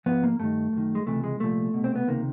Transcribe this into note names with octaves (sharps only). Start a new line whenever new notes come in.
G#2 F3 B3
A#3
G2 D#3 A3
F#2 D#3
G#3
C#2 C3 E3 A3
G#3
C2 A#2 F3 A3
C2 B2
C4
B3
C#2 C3 D#3 A#3